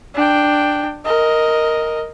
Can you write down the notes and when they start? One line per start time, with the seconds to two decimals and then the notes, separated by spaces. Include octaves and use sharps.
0.15 D4 G5
1.05 A#4 D#5